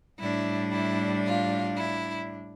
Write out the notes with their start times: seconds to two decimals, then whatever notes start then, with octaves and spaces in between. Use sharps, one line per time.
0.19 A2 G3 D4 E4
0.72 E4
1.25 F4
1.77 E4